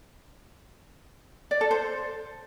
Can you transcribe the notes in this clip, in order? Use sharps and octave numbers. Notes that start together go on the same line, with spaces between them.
D5
A4
C5